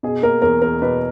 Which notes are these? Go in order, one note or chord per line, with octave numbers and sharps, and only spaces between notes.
B2 G#4
A#3 A#4
E2 A#4
E2 A#4
B2 B4